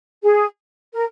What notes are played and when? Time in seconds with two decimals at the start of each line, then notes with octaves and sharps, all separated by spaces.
0.23 G#4
0.94 A#4